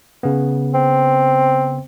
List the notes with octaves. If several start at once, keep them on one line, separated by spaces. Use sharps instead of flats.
C#3 B3
C4